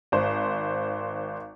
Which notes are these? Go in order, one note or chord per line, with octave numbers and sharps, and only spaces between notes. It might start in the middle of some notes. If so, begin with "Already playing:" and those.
G#1 C5